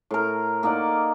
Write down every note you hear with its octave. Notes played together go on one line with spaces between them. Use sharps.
A2 A#4
A#3 D#4 D5 F#5